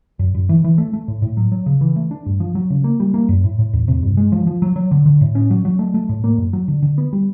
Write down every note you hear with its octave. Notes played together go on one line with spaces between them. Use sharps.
F#2
F#2
E3
E3
A3
A3
A2
A2
F#3
F#3
C#3
E3
A3
D4
G2
F3
F#3
C#3
A#3
G3
A#3
F#2
A2
A2
E2
C3
G2
G#3
F3
F3
F#3
F#3
D3
D3
A2
C#4
F#3
F#3
A3
A3
A2
A#3
F#2
F#3
D3
D3
B3
G3